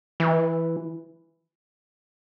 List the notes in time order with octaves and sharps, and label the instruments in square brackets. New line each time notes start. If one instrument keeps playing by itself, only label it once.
[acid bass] E3